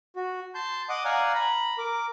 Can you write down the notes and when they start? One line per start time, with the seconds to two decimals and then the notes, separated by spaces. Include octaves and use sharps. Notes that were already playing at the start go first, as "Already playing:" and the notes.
0.16 F#4
0.55 A5 C6 G6
0.89 D#5 F#5 D6 D#6
1.05 D5 F5 F#5 G#5 A#5
1.35 A#5 B5
1.78 A#4 D6